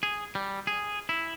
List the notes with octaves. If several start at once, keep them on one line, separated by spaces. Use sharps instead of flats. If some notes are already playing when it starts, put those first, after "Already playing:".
G#4
G3
G#4
E4